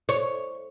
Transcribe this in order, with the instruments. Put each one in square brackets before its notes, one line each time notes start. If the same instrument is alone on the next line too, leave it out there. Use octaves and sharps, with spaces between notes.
[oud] C#5